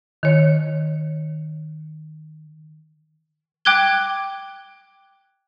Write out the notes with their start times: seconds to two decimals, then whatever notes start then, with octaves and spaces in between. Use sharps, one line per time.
0.23 D#3 C#5
3.65 G5 D6 F#6 G#6 G7